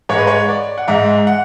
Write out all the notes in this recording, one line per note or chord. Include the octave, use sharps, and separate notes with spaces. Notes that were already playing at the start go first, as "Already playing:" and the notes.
G#2 G#3 C#5
B4
C#5
D5
F#5
G#2 G#3 E5
F#5